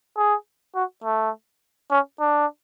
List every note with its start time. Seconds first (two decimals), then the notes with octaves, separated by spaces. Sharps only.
0.17 G#4
0.75 F#4
1.04 A3
1.91 C#4
2.20 D4